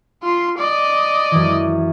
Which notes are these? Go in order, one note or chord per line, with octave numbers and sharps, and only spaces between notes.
F4 C6
D5 D#5
F#2 E3